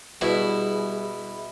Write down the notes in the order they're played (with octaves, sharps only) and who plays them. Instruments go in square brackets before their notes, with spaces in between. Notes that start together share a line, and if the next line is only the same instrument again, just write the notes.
[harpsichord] B2 [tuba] G3 [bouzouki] E4 [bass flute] G#4